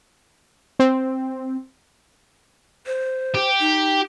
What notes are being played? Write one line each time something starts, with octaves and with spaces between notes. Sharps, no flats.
C4
C5
G4
D#4